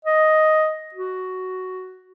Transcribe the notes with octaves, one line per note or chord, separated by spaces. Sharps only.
D#5
F#4